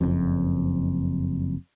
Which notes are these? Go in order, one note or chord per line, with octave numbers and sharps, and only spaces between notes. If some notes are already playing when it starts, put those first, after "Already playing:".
F#1 F2